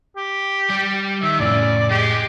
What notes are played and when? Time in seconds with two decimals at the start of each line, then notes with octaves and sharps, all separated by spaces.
0.17 G4
0.70 G3
1.23 D#3 E5
1.40 F2 A2 C#3 D5
1.90 G#3 G4